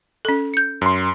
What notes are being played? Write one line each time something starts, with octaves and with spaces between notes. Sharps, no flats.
C#4 A4
G6 C#7
F#2 C6